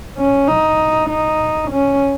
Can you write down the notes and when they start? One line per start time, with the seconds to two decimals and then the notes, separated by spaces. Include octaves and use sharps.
0.18 C#4
0.48 D#4
1.09 D#4
1.71 C#4